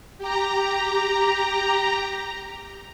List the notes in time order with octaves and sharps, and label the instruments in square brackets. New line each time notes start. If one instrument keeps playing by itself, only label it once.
[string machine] G4 A#5